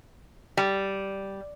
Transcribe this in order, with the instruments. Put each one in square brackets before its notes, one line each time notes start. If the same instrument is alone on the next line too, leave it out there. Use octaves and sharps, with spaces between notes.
[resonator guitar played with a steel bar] G3